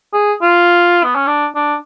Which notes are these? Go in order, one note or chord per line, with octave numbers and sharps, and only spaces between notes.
G#4
F4
B3
C#4
D4
D4